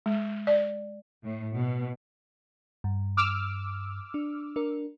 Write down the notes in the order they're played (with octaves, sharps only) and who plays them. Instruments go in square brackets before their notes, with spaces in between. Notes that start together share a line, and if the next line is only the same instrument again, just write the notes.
[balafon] G#3
D5
[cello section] A2
B2
[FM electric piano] G2
[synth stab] D6 E6 F6
[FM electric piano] D4
D4 A#4